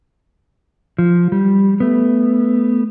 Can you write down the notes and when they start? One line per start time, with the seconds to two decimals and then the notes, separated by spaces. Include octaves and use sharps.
0.98 F3
1.32 G3
1.80 A3 B3